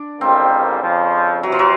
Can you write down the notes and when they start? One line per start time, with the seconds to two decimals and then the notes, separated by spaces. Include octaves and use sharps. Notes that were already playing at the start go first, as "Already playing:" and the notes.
Already playing: D4
0.21 A1 G#2 D#3 G3 A#3 C4
0.82 F2 C#3 F3
1.43 C3 E3 F#3
1.52 F3
1.59 F#3